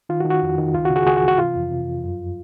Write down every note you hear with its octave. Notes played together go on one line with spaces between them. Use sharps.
D#3 F4
F#4
D#3
F#4
F2
D#3
C#2 F4
F#4
C#3
F#4 G#4
C#2 F#4 G#4
F#4
E3
F#4
C3 F4
F2
C3
F2
F#2